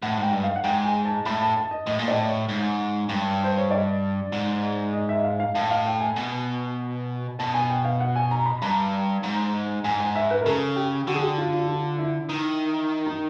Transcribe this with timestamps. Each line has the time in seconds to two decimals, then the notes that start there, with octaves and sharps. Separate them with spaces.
0.02 A2 F#5
0.18 G#2 G5
0.33 G2
0.44 F5
0.56 F#5
0.64 G#2 G5
0.84 G#5
1.05 A5
1.25 A2 B5
1.41 A5
1.57 A5
1.71 D#5
1.86 A2 D#5
1.99 A#2
2.08 A2 D5
2.28 C#5
2.49 G#2
3.09 G2
3.44 C5
3.58 C#5
3.71 D5
4.32 G#2
4.93 D#5
5.09 E5
5.24 F5
5.40 F5
5.55 A2 F5
5.71 F5
5.86 G5
6.01 G#5
6.16 B2
7.39 B2 A5
7.54 G#5
7.70 G5
7.85 F5
8.01 F#5
8.16 G#5
8.31 A#5
8.46 B5
8.62 G2 A#5
9.23 G#2
9.84 G#2 G#5
10.00 G#5
10.15 E5
10.31 B4
10.41 A#4
10.46 C#3 A4
10.76 G4
11.07 D3 F#4
11.15 G#4
11.22 G4
11.38 F4
11.53 F4
11.68 F4
11.98 E4
12.29 D#3
13.07 D#4